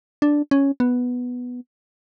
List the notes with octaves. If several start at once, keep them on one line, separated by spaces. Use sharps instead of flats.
D4
C#4
B3